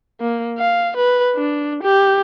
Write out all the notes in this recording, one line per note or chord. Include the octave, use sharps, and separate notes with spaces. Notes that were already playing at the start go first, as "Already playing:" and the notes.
A#3
F5
B4
D4
G4